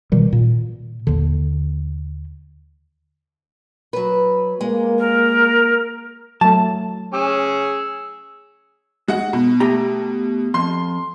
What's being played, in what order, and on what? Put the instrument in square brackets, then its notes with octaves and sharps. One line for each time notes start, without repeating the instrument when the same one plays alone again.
[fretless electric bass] B2 D#3 E3 G3
A#2
D#2 D3
[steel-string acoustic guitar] F#3 B4
[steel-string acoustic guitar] G#3 [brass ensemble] A#3
[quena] A#4
[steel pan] F#3 A3 [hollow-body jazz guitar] A5
[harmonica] C#4 G#4 [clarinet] E6
[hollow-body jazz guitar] G#3 [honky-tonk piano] F#4 F#5
[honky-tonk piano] B2
[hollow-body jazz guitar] A3 G4 A#5
[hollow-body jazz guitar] F2 [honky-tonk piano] C6